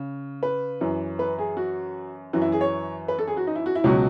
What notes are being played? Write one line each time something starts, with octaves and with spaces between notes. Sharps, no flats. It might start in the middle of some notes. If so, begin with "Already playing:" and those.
Already playing: C#3
B4
F#2 E3
B4
G#4
F#4
F#2 E3 F#4
E4
G#4
C#5
B4
A4
G#4
F#4
D#4
E4
F#4
E4
C#2 B2 F#3 F#4